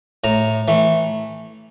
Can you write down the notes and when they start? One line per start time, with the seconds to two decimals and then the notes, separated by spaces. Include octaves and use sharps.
0.24 A2 A#5
0.68 E3 A3